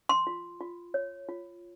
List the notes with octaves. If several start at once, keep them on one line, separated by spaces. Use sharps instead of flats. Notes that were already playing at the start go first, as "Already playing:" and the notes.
C6
F4
F4
C#5
F4